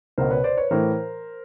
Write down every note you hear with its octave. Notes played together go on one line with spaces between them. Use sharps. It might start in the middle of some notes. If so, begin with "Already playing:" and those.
C#2 B2 A#4 C5
B4 C#5
C5 D5
B4 C#5
A2 E3 A#4 C5